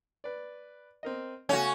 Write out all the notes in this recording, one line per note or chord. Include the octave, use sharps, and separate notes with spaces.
B4 D5
C4 A#4 D#5
C#3 A3 C#4 F#4 G#5